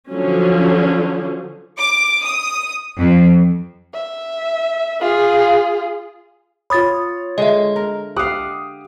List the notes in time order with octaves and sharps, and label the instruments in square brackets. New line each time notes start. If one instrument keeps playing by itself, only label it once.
[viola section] D3 F3 F#3 C#4
[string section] D6
D#6
F2
[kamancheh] E5
F4 G#4
[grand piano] F4 C#5 [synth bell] B5 D#6 A6
[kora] D3 G#3 [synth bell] D#5 E5
[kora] A#4
[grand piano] G4 D6 D#6 [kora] F5 F#5